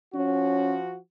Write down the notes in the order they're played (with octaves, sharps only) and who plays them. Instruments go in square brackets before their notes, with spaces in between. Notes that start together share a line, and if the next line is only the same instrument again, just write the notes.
[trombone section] F3 F#4 [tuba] C#4